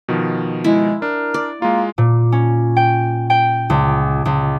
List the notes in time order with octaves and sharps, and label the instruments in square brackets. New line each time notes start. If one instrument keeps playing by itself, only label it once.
[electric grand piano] B2 D#3 F3
[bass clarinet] G#3 [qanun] E4
[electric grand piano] D4 [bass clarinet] A#4
[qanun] D5
[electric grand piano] G#3 F4 [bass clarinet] A#3
[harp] A#2
C#4
G5
G5
C#2
C#2